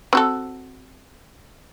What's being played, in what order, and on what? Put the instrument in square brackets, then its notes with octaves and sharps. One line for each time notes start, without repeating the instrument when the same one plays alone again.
[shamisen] C4 F#4 A4